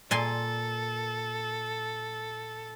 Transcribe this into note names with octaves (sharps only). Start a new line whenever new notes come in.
A#2 A4 G#5 C6